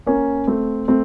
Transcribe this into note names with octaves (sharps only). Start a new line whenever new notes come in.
A#3 C#4
A3 C4
A3 C4